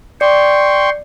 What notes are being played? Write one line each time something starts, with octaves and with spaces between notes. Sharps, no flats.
D5 G5 C6 C#6